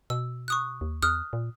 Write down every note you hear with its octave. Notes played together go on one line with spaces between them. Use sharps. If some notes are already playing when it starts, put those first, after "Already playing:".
B2 E6
C#6 D#6 F#6
D#2
E2 D#6 F6 F#6
A#2